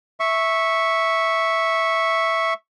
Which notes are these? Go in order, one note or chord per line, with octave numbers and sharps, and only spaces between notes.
E5 C#6